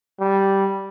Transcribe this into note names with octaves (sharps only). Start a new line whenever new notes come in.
G3